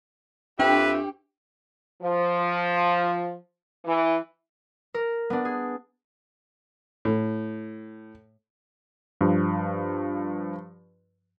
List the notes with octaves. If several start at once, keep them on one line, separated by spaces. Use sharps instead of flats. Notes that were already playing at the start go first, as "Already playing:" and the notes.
F2 D4 G4 B4 E5 G5
F3
E3
A#4
B3 D4
G#4
A2
G2 F3